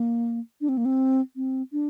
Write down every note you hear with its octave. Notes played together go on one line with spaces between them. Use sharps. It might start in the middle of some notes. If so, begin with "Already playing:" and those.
Already playing: A#3
D4
C4
A#3
C4
C4
D4